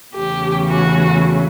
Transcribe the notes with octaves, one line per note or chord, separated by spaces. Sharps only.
E2 C#3 E3 A3 C#4 G4
F#4